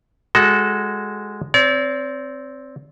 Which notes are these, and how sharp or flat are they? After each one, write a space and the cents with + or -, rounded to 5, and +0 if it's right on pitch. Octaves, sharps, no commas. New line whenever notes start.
G#3 -5 F#4 +10 A4 -15
C4 +0 D5 -40